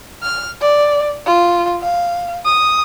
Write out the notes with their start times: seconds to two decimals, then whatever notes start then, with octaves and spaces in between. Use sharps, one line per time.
0.23 F6
0.61 D5
1.26 F4
1.82 F5
2.46 D#6